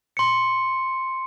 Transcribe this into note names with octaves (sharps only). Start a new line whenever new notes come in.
C6 C#7